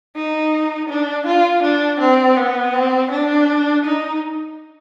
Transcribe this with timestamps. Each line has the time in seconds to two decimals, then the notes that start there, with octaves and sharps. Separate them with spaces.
0.16 D#4
0.89 D4
1.27 F4
1.63 D4
2.00 C4
2.37 B3
2.73 C4
3.11 D4
3.85 D#4